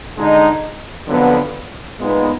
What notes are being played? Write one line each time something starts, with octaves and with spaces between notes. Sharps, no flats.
D3 G#3 D#4
F2 D3 F#3 B3
A#2 G#3 B3 D#4